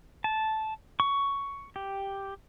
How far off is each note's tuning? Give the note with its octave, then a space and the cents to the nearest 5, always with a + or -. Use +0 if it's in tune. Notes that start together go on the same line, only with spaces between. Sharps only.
A5 -10
C#6 +10
G4 +0